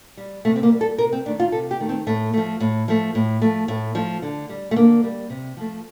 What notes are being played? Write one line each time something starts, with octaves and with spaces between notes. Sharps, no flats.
G3
C3 A3
C4
A#3
G3
A4
C3 A#4
C4
D#3 A3 D4
F4
C3 A4
G4
D#3 A3
C4
A2 A3
F3 A3
A2
F3 A3
A2
F3 A3
A2 A3
F3 A3
D3
G3
A3
D3 A#3
G3
C3
F3 A3